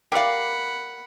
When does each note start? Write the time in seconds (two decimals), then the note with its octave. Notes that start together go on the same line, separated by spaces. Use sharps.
0.12 G4 A#4 D5 F5 F#5 B5